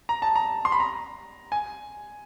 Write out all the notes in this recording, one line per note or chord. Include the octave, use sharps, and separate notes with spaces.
A#5
A5
A#5
C6
B5
A#5
G#5